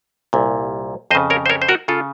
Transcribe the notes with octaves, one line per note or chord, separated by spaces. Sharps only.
C2 A#2
F2 C#3 C5 D#5
A#4 C#5
C5
A#4 C#5
C5
F#4 A#4
C#3 F4 A4